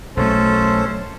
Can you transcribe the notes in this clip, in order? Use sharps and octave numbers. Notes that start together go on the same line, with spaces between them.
B1 F#3 A3 C#4 A4 C5